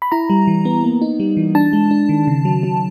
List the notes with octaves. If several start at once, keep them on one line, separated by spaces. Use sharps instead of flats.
B5
E4 A#5
G3
E3
B3
A#3
D#4
G3
E3
D4 A5
G#3
D4
D#3
C#3
F#3
F#3